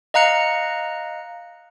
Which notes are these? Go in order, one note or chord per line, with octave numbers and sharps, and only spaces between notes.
D#5 F5 A#5 F#6 C#7